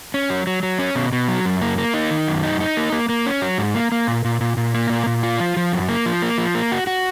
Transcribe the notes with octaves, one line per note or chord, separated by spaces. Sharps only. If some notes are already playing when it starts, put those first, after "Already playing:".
C#4
F#3
F#3
F#3
C#4
B2
B2
F#3
F#2
A#3
A#3
D#4
D#3
F#2
D#4
D#4
A#3
A#3
A#3
C#4
F#3
G#2
A#3
A#3
A#2
A#2
A#2
A#2
A#3
A#2
A#2
F4
F3
F3
F#2
A#3
F3
A#3
F3
A#3
F#4
F#4